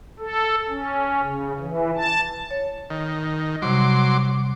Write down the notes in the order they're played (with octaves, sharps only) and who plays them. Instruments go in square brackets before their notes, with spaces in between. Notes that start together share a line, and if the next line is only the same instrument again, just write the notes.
[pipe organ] A4
C#4
C#3
E3
A5
[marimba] C#5
[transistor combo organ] D#3
[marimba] C3 G3 [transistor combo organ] F#3 C6 D6